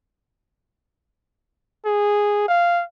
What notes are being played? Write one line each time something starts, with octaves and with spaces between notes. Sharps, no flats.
G#4
F5